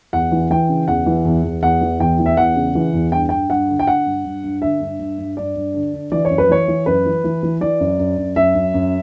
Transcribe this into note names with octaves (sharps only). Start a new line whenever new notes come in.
E2 F#5
E3
E3 G5
C#3
E2 F#5
E3
E2
E2
E2 F#5
E3
E2 G5
E3
E5
E2 F#5
C#3
E3
E2
G2 G5
G2 G5
G2 F#5
D3
G5
D3 F#5
G2
G2
G2
D3 E5
G2
G2
G2
G2 D5
G2
D3
D3
E3 D5
C#5
F#2
B4
E3 C#5
E3
F#2 B4
E3
E3
E3
E3 D5
F#2
F#2
F#2
F#2 E5
F#2
F#2